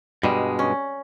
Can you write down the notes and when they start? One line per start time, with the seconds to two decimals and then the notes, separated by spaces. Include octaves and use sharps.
0.23 G2 B2 G3 G#3
0.59 C#4